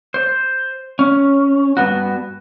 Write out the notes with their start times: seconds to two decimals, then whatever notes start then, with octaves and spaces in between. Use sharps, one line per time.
0.14 C5
0.99 C#4
1.77 G2 C3 B3 F#4